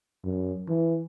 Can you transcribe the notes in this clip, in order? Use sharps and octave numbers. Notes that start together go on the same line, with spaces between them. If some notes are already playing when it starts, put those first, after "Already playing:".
F#2
E3